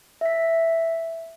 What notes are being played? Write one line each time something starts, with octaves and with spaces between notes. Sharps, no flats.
E5 B6